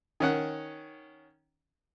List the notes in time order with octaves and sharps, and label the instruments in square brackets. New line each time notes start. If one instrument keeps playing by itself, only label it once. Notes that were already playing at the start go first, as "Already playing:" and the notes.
[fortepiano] D#3 C#4 F#5